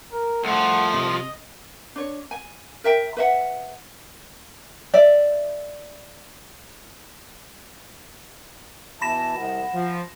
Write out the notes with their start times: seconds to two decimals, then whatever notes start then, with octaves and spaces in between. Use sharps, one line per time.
0.12 A#4
0.44 C2 F3 A3 F#5
0.94 C3 D#5
1.96 D4 C#5
2.31 G#5
2.84 A#4 E5 G5
3.17 B4 E5 F#5
4.94 D5 E5
9.02 B2 E3 E5 A5 B5 A#6 E7
9.37 C2 D#5 F#5
9.73 F3